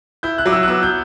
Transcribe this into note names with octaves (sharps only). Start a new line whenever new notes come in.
E4 G6
F#6
F#3 D6
E6
F#6
B3 E6
G6